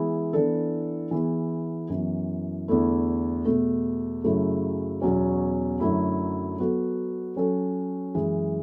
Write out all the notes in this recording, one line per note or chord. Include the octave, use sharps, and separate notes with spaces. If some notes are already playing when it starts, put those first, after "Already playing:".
Already playing: E3 G#3 B3 E4
E3 B3 D4 A4
E3 B3 E4 G#4
F#2 E3 B3
E2 D3 A3 E4
E2 B2 A3
F#2 C#3 F#3 A3 E4
E2 B2 F#3 C#4
F#2 D3 F#3 A3 E4
F#3 B3 F#4 A4
F#3 C#4 F#4 A4
F#2 E3 G#3